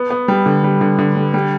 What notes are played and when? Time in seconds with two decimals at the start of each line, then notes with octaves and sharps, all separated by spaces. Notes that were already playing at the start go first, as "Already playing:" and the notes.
Already playing: B3
0.10 B3
0.28 G3
0.46 D3
0.64 G3
0.81 D3
0.99 D3
1.16 G3
1.34 G3